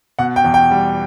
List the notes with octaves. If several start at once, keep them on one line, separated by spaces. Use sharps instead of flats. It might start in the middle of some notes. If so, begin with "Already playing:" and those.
B2 F#5
G5
E2
G5
G3